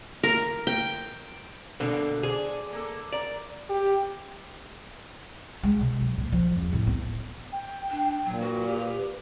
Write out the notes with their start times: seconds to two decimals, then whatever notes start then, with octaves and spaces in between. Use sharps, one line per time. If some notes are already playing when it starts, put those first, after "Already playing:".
0.23 A#4
0.67 G5
1.80 B2 D3 A#3 D4
2.23 D4 G#4 C5
2.73 A#3 A4
3.13 A#4 D5
3.70 G4
5.63 G#3
5.81 B2
6.01 F#3
6.18 A#2
6.32 F3
6.56 E2
6.73 A2
6.87 B3
7.52 G5
7.90 D4
8.25 A#2 F#3
8.40 F#4 B4
8.67 G4